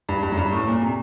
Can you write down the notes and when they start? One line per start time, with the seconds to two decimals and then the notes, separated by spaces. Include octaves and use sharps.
0.09 G2
0.23 G2
0.32 F#2
0.38 G2
0.53 A2
0.67 A#2
0.82 C3